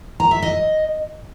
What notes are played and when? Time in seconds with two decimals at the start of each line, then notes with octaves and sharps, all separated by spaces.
0.20 A#5
0.31 E5
0.42 D#5